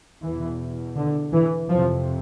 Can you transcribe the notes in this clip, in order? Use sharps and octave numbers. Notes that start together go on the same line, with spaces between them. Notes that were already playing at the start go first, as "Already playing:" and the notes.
E2 B2 E3
D3
E3
F2 C3 F3